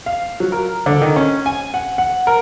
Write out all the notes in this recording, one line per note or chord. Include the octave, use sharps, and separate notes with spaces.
F5
F#3
A#4
D3
D#3
C#4
G#5
F#5
F#5
A#4